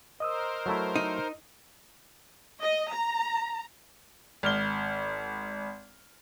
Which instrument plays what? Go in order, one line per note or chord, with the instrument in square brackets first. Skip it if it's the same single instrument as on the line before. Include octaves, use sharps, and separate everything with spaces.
[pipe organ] A#4 C5 [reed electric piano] D#5 D#6 E6
[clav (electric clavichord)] F#3 A3 E4
[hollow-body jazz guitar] D#4
[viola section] D#5
A#5
[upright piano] G#1 F6 G7